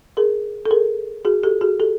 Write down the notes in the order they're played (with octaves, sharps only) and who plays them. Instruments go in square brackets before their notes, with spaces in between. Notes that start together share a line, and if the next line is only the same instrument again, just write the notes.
[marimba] G#4 A#4
A4
G#4 A#4
F#4 G#4
G4 A4
F#4 G#4
G4 A4